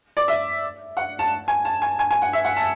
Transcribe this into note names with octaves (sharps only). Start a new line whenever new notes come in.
D5
E5
F#5
A5
G#5
A5
G#5
G#5
G#5
F#5
E5
F#5
A5